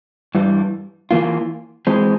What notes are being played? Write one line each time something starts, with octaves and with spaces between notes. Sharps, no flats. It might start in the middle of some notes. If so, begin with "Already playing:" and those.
G2 E3 G3
E3 A#3 F4
E3 G#3 C4